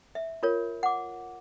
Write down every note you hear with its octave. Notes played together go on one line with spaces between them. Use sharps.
E5
F4 A#4 C#5
F#5 D6